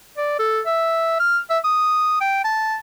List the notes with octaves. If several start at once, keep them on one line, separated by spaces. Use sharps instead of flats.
D5
A4
E5
F6
E5
D#6
G5
A5